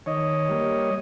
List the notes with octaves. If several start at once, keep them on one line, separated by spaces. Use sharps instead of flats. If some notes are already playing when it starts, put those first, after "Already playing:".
D#3 C#5 D#5
G3 A#3